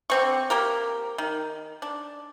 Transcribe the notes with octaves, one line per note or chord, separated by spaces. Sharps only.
D3 C4 C#6
A#3 G4 A#4
D#3
D4